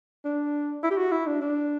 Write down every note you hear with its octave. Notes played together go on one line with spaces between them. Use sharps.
D4
E4
G4
F#4
E4
D4
D4